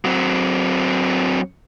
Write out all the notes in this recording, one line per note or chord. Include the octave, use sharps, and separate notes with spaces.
F#3 C4